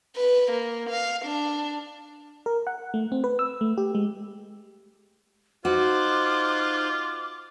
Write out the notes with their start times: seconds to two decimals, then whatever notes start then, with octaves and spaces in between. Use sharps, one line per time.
0.16 B4
0.51 A#3
0.89 F5
1.25 D4
2.46 A#4
2.67 F#5
2.94 A3
3.12 C4
3.24 B4
3.39 E6
3.61 A3
3.78 G4
3.95 G#3
5.65 D#4 F4 F#4 C5 D6 F#6